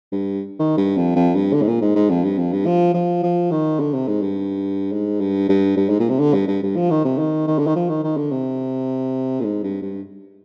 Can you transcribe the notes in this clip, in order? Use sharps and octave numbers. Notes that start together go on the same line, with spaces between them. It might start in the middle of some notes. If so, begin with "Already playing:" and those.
G2
D#3
G2
F2
F2
G2
D3
G#2
A#2
G#2
G#2
F2
G2
F2
G2
F3
F3
F3
D#3
D3
C3
G#2
G2
G#2
G2
G2
G2
G#2
A#2
C3
D3
G2
G2
G2
F3
D#3
C3
D#3
D#3
D3
D#3
F3
D#3
D#3
D3
C3
A#2
G#2
G2
G2